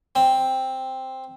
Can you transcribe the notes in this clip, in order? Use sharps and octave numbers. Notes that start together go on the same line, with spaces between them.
C4